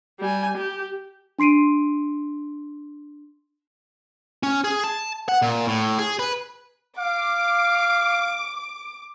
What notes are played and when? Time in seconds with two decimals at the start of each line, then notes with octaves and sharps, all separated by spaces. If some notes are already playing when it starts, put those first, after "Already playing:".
0.19 G3 G#5
0.57 G4
1.39 D4 C6 C7 D7 D#7
4.43 C#4
4.64 G#4
4.84 A5
5.29 F#5
5.42 A#2
5.67 A2
5.99 G#4
6.19 B4
6.99 F5 D6